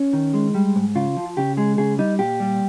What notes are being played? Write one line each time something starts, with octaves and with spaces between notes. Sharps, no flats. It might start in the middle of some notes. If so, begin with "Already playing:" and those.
Already playing: C#4
D#3
G#3
G3
G#2
C#3 F4
F3
C#3 G4
G#3 G#4
C#3 G#4
G3 D#4
A#2 G4
G3